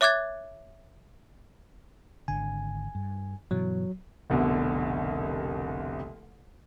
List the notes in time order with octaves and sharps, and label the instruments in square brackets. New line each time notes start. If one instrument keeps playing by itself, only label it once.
[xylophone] C#5 E5 D6 F#6 G#6 A6
[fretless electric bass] G#1 D3 [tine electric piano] G#5
[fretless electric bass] G2
[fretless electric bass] G2 B2 E3 [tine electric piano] F#3
[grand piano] F1 C2 B2 D3